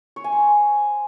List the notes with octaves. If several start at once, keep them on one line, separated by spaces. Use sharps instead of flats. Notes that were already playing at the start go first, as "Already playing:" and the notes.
C#5
G#5
C5